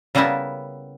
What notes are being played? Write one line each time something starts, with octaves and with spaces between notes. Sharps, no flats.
C#3 G3 A#3 B3 E4 A5